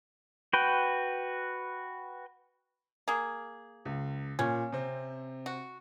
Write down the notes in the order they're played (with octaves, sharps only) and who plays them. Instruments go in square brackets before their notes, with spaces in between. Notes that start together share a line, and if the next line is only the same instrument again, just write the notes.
[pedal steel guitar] F#4 B4 G5
[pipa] A#3 G#4
[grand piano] C#2
[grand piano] A#2 [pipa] C#4
[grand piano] C3 C4
[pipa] F#4